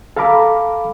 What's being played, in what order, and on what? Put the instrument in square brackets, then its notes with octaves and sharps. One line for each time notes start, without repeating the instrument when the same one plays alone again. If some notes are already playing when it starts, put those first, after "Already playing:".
[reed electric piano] A4 F5 A#5 B5 D6